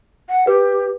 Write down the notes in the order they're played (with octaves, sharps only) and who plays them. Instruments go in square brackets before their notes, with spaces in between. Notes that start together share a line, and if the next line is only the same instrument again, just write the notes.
[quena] F#5
[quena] G4 [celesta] B4